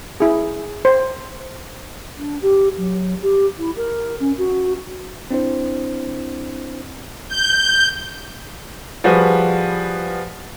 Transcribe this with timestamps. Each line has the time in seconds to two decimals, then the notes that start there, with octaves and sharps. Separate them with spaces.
0.20 E4 G#4
0.85 C5
2.18 D4
2.42 G4
2.77 F#3
3.22 G4
3.58 E4
3.76 A#4
4.19 C#4
4.37 F#4
5.31 C4 D4 E4 C5
7.28 G6
9.04 F3 G3 F#4 G#4 B4